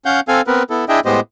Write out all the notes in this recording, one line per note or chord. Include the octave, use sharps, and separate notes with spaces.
C#4 F5 F#5 G6
C4 A4 F5 G#5
B3 C4 A#4 B4
B3 E4 A4
D4 E4 G#4 D#5 E5 G5
A2 G#3 B3 G4 C5 D#5